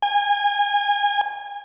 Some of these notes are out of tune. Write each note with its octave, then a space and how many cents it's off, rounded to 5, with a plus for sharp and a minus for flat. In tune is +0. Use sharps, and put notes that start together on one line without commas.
G#5 -25